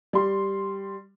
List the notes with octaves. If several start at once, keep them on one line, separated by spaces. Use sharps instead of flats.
G3 C6